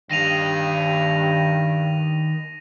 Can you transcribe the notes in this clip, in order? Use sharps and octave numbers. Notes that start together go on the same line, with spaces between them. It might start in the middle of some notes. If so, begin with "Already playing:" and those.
G2 D#3 F5 A#6 D#7 F7